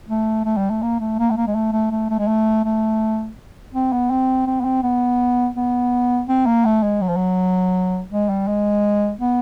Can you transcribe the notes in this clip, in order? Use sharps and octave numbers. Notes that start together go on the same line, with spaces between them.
A3
A3
G3
A3
A#3
A3
A#3
A3
A#3
G#3
A3
A3
A3
A3
G#3
A3
A3
C4
B3
C4
C4
B3
C4
B3
B3
C4
A#3
A3
G#3
F#3
F3
F#3
G#3
G3
G#3
B3